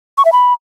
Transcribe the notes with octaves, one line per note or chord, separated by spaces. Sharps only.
C#6
E5
B5